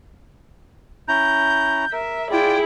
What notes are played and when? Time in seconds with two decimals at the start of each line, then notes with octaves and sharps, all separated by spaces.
1.08 C#4 E4 A#5 G6
1.92 A#4 E5
2.31 E4 F4 G#4 D5 G5